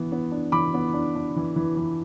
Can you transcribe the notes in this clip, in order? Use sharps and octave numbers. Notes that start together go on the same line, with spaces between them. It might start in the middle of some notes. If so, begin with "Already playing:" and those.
Already playing: E3 B3
B3
D4
E3 B5 D6
B3
D4
D4
E3
E3
E3